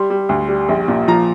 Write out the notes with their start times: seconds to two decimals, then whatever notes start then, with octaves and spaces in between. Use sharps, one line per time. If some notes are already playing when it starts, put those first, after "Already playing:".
Already playing: G3 C6
0.10 G3
0.29 D2
0.49 G3
0.69 A#1
0.88 A#2
1.08 F3 A#5